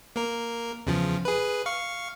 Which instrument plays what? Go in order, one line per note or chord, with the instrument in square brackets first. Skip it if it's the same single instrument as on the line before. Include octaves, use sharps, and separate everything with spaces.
[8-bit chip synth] A#3 A#4
E2 C#3 F3
G#4 B4
F5 C#6